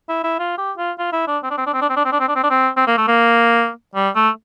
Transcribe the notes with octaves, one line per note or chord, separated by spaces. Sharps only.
E4
E4
F4
G4
F4
F4
E4
D4
C4
D4
C4
D4
C4
D4
C4
D4
C4
D4
C4
D4
C4
D4
C4
C4
A#3
A3
A#3
G3
A3